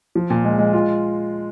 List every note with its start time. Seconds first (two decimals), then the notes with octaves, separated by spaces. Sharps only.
0.15 F3
0.30 A#2
0.44 G#3
0.58 G#3
0.73 F4